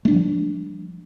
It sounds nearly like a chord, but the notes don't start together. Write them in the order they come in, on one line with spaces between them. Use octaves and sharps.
A3 D4 G3 F3